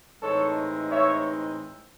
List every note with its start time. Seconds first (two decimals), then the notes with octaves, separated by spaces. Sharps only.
0.21 A2 E3 G#3 C4 D#4 A4 C#5
0.91 C#5 E5